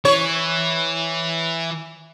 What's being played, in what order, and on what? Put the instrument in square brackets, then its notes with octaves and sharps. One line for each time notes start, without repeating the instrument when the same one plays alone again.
[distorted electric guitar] E3 [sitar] C#5